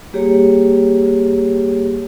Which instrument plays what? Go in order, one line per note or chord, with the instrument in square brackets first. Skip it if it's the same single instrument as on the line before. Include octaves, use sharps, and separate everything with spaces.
[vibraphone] G3 A#3 G4 G#4 C#5